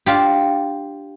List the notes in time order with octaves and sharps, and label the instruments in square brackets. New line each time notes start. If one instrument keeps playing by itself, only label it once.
[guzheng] D4 F4 G4